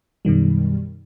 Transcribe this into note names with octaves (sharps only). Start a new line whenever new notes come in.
F#2 B2 D#3 G3